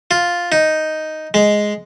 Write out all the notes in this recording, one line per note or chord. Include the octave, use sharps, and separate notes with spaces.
F4
D#4
G#3